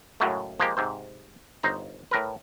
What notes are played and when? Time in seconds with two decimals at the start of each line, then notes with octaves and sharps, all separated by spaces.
0.20 F#2 A2 C#3 F#3 G#3 A3
0.60 F3 G#3 A#3 G4
0.77 G#2 C3 C5
1.63 G1 D#4 C5 A#5
2.11 A2 A#4 B4